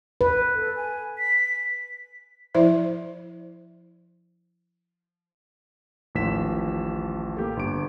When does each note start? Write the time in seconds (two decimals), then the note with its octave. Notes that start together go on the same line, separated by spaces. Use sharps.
0.21 B4
0.55 A4
0.76 G#5
1.18 B6
2.55 F3 E4 C5 D5 E5
6.15 A1 D#2 F3 B6 E7
7.37 A#3 G4 A4
7.57 G1 D7